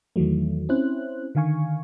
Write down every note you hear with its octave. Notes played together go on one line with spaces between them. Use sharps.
E2 D#3 E3 F#3 A3
C4 C#4 E4 C5 F#6
D3 D#3 F5 G#5 C#6